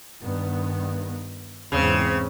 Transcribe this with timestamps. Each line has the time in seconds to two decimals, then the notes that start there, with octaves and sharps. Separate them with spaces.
0.22 G2 D#3 B3
1.72 E2 G#2 C#3 C4